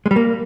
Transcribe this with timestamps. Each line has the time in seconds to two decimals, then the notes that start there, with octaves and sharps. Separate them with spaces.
0.06 G#3
0.11 G3
0.16 A#3